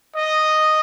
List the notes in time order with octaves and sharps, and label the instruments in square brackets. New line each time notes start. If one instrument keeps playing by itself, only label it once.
[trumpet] D#5